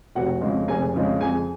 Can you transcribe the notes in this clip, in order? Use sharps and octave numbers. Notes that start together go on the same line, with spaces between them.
F1 F#4 F#5
F2 C#3 G#3
F1 G#4 G#5
F2 C#3 G#3
F2 G#4 G#5